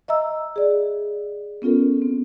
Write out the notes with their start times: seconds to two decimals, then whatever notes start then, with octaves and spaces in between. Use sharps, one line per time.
0.08 D#5 E5 A#5 E6
0.56 G#4 D5
1.62 B3 C#4 F4 A4 A#4
2.02 C4